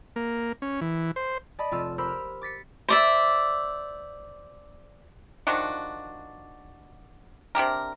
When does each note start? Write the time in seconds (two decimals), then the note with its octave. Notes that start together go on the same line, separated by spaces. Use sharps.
0.16 A#3
0.62 C#4
0.81 E3
1.16 C5
1.59 D5 D#5 A5 B5 D#6
1.71 F1 C4 F4 E6 D#7
1.98 G4 A#4 C5 B5 E6 F6
2.42 D6 A6 B6 C#7
2.88 C5 D5 E5
5.47 D#3 F3 D4 F#4
7.55 C3 D4 G4 A#4